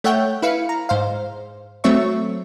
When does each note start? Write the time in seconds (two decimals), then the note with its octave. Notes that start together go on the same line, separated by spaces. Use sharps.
0.04 A3 C#5 E5 F#5 G5 G6
0.42 E4 B4 F5 C#7
0.69 A#5
0.89 G#2 C5 F5
1.84 F#3 A3 C4 C#5 E5 C#6